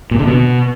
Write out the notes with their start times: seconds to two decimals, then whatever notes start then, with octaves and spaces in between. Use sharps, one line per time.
0.11 A#2
0.19 D3
0.27 B2